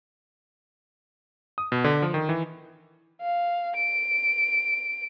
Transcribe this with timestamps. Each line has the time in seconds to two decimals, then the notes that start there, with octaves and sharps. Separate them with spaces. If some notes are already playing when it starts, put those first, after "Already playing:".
1.58 D#6
1.72 B2
1.84 D3
2.02 F3
2.14 D#3
2.29 E3
3.21 F5
3.76 D7